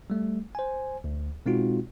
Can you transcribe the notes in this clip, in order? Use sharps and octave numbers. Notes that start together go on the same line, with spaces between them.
G3 A3
C5 G#5
D2
B2 G#3 C4 D#4 F4 F#4